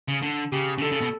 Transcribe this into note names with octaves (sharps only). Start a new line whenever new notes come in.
C#3
D3
C#3 G4
C#3
D3 A4
C#3
B2